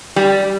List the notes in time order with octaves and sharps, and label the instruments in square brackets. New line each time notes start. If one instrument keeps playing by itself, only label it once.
[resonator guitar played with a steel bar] G3